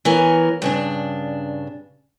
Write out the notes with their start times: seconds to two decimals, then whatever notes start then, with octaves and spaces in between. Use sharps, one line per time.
0.05 E3 B3 A#4 C#5
0.62 G2 C#3 D4